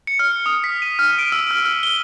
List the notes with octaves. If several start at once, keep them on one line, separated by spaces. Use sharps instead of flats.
C#7
F6
D#6
B6
D#7
F6
D7
E6
F6
F6
G7